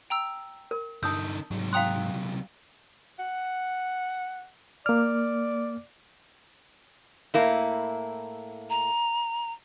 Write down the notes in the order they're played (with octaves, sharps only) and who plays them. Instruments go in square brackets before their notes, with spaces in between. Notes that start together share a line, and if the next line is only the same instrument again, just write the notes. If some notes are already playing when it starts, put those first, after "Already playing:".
[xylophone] G5 A#5 E6
[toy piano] A#4
[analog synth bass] G2 [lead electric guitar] D3 D#4 [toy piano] A5 D#6 E6 [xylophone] G6
[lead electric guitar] C2 F#3 [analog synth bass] G#2
[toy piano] F5 G5 C6 [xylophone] A#5 D#6 F#6
[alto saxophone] F#5
[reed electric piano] A#3 F6 [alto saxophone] D5
[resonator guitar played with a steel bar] A2 A#3 E4
[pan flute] A#5